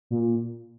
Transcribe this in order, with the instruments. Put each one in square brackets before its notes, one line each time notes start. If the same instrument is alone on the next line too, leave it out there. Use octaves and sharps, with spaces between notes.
[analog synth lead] A#2